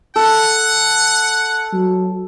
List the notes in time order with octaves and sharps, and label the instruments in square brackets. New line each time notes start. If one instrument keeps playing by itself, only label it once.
[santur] A4 [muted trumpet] F#5
[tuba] F#3